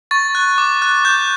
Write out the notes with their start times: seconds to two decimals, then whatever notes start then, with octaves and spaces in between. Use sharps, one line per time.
0.11 C#6 A6
0.35 F#6
0.58 D6
0.82 F#6
1.05 D6 G6